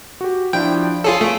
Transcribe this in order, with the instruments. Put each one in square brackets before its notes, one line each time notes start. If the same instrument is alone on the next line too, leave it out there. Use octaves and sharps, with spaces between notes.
[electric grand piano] F#4 G4
[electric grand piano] F3 D4 E4 [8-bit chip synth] G5
[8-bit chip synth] F4 G#4 A4 [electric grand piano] C#5
[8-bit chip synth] A3 [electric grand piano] D7 D#7